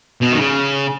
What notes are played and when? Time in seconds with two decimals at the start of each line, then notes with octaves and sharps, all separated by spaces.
0.22 B2
0.33 D#3
0.39 C#3